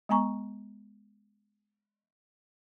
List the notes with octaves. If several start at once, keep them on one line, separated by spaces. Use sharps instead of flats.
G#3 B3 G#5 A#5 C#6